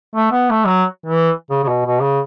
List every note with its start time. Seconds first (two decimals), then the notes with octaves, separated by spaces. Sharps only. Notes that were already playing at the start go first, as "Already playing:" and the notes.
0.15 A3
0.32 B3
0.50 A3
0.66 F#3
1.06 E3
1.50 C#3
1.64 C#3
1.68 B2
1.85 B2
2.02 C#3